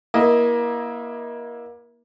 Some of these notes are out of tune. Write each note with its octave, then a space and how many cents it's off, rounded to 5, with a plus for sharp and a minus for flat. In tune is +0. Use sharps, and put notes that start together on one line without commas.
A#3 +30 E4 +0 D#5 +5